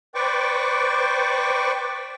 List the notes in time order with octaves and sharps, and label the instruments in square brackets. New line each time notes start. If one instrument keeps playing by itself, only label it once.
[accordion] B4 C5 D5 G5 C#6 D6